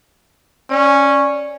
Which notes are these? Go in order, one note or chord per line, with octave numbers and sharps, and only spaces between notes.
C#4 D5